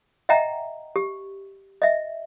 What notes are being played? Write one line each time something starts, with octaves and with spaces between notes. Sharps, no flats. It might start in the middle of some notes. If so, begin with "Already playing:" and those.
D#5 E5 F#5 G5 A#5
G4
D#5 E5